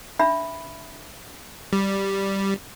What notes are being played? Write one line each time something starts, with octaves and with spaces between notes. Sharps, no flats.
D4 E5 B5
G3